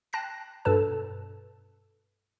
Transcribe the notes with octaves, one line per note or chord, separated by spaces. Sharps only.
G5 A5 F#6 A#6 C7
G2 B2 A4 B4 A5